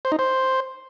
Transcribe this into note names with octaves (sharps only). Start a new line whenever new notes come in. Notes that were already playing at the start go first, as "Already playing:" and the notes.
C5
D#4
C5